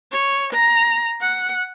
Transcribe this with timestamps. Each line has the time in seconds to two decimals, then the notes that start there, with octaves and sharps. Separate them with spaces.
0.11 C#5
0.53 A#5
1.21 F#5